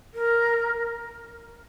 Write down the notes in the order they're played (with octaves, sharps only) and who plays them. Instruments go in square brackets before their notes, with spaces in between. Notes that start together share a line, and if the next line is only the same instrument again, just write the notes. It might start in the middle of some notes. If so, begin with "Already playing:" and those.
[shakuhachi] A#4